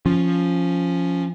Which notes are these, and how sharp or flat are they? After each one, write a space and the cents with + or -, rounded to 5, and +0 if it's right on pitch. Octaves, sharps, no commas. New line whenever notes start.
F3 +0 C#4 +0